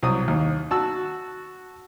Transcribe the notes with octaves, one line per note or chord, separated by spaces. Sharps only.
C2 F#3 D#6
D#2
F#4 A5 E6